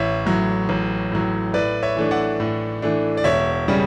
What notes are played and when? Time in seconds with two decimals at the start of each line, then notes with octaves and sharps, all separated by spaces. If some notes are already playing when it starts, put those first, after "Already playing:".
Already playing: A1 C#5 E5
0.26 A2 F#3
0.69 A1
1.12 A2 F#3
1.54 A2 B4 D5
1.83 C#5 E5
1.97 E3 A3 D4
2.11 D5 F#5
2.40 A2
2.82 E3 A3 D4
3.17 D5
3.24 E1 C#5 E5
3.68 C#3 G3 C#4